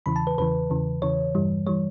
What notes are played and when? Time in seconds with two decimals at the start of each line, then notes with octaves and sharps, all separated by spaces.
0.06 E2 C#3 E3 B5
0.16 A5
0.27 B4
0.38 E2 C#3 E3 B4
0.70 E2 C#3 E3
1.02 E2 C#3 E3 C#5
1.35 G2 E3 G3
1.66 E3 G3 C#5